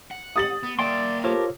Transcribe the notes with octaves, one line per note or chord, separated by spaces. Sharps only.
F#5
D#6 A6 F#7
B3
A#3 D5 E5 G5 C6
F4 G4 A4 A#4 C5 C#5